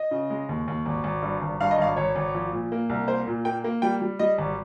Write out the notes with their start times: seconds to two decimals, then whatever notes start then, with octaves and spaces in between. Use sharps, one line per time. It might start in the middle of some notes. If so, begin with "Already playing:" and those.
Already playing: D#5
0.11 C#3
0.30 G#3
0.49 D#2
0.68 D#2
0.86 G#1
1.04 G#1
1.22 G2
1.41 G#1
1.61 G2 F5
1.71 D#5
1.78 G#1 F5
1.97 G#1 C#5
2.16 G#1
2.35 F3
2.52 A#2
2.72 A#3
2.89 C2
3.08 A#3 C5
3.27 A#2
3.45 A#3 G5
3.64 A#3
3.82 G3 G5
4.02 G3
4.19 G3 D#5
4.38 G#1